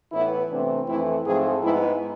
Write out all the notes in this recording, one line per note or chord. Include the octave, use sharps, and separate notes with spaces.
A2 E3 B3 E4
C3 E3 A3 C4 D4
F2 E3 A3 C4 E4
G#2 F3 A3 C4 G#4
G#2 G#3 B3 E4